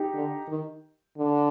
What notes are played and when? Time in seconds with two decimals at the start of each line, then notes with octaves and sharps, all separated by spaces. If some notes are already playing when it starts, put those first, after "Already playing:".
Already playing: D#4 G4
0.14 D3
0.48 D#3
1.18 D3